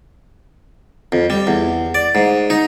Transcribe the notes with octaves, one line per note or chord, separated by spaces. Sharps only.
F2
G3
E2
D5
G#2
D#4